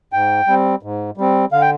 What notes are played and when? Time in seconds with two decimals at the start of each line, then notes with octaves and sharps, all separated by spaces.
0.13 G#2 G5
0.48 G3 C4
0.83 G#2
1.17 G3 C4
1.52 D3 F5
1.61 G5